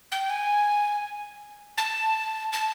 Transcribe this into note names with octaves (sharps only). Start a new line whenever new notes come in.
G5
G#5
A5
A5